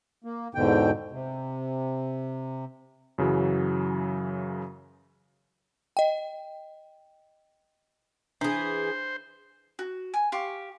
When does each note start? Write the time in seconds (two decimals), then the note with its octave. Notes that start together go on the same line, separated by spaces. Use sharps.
0.24 A#3
0.55 E2 G#2 B2 D3 G5
1.12 C3
3.18 F#2 C#3 E3 F#3
5.97 D#5 G5
8.41 E3 D4 G#4 C5
9.79 F#4
10.14 G#5
10.32 G4 F5 C6 C#6